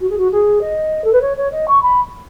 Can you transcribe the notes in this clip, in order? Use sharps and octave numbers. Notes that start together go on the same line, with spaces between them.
F#4
G#4
F#4
G#4
D#5
A4
B4
C#5
C#5
D#5
C#6
B5